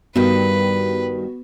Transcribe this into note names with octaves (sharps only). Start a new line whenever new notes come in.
G2 D#3 B3 F#4 B4